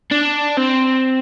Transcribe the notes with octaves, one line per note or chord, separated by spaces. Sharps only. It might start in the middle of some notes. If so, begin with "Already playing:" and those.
D4
C4